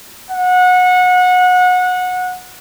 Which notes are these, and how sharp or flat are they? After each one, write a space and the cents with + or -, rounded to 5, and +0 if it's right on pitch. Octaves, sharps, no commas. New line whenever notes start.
F#5 -25